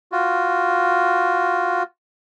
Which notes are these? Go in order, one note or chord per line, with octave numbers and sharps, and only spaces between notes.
F4 F#4